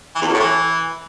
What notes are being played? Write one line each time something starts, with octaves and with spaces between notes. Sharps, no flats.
E3
E2
F#2
A2
E3